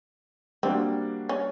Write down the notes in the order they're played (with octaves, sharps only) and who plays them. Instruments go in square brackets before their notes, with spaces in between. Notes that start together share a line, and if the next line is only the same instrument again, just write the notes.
[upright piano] G3 A#3 D4 F#4 [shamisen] C4
[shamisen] C#4